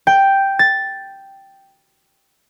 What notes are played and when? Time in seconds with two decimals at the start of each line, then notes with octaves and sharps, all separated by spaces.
0.07 G5
0.59 A6